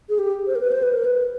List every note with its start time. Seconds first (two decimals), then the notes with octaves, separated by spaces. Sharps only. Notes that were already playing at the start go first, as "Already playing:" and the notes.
0.09 G#4
0.19 G4
0.47 C5
0.56 A#4
0.61 B4
0.72 C5
0.83 B4
0.93 A#4
1.05 B4